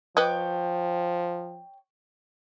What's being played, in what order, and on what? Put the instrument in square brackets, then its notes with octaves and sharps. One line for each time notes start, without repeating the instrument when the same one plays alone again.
[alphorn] F3 [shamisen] B4 D#5 [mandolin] C#5 G5 D6